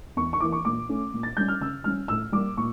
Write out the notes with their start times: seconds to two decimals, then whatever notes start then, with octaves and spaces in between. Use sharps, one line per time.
0.17 E2 C#6
0.33 C#6
0.40 E3 A#3 D6
0.52 C#6
0.65 A#2 D6
0.89 A3 C#4
1.14 A#2
1.23 A6
1.37 G3 C#4 G6
1.48 F6
1.61 C#3 E6
1.84 G3 C#4 F6
2.08 A2 E6
2.32 G3 A#3 D6
2.57 A#2 C#6